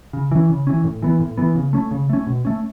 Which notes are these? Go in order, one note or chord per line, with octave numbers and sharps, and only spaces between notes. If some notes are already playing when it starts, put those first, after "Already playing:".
C#3
E3 C#4
C#3
E3 C#4
A2
E3 B3
A2
E3 B3
C#3
A3 C#4
C#3
A3 C#4
B2
A3 C#4